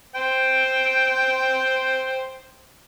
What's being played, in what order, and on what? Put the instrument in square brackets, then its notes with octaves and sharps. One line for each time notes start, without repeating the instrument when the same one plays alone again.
[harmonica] C5 G5